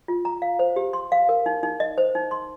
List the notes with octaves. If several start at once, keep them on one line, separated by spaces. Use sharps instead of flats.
F4
A#5
F5
C5
G4
C6
F5
A#4
D#4
D#4
D#5
C5
D#4
C6